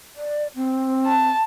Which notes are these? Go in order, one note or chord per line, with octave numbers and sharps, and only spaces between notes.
D5
C4
A5